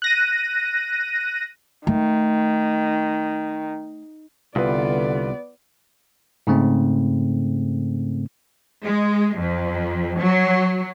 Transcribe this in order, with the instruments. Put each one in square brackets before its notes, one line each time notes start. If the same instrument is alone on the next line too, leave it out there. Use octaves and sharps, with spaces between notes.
[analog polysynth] F#6 A#6 D#7
[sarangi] D#3 [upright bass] A3
[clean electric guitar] C2 [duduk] D3 [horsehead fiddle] B3 D5 [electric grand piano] F4 B4
[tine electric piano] G#2 C#3 A3 C4
[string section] G#3
F2
F#3